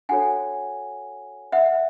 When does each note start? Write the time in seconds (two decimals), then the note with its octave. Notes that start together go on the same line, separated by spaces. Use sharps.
0.09 D4 F#4 A4 C#5 F#5 G#5
1.52 E5 F#5